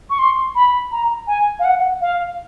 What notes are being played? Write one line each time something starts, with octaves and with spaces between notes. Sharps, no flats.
C#6
C6
B5
A#5
G#5
F5
F#5
F5